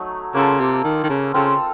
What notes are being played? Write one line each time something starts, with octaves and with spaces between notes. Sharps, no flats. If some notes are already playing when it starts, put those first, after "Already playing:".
Already playing: F#3 A3 D#4
C#3 A#3 F4 A4
C3
D#3
D#3
C#3
C#3 C4 F4 A4